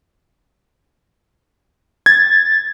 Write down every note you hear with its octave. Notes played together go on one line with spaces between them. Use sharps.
G#6 A6